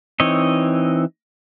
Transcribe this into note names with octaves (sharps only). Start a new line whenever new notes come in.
E3 C4 D#4 C#5 D#5